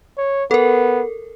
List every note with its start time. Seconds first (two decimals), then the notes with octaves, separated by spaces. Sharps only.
0.18 C#5
0.51 B3 A4 A#4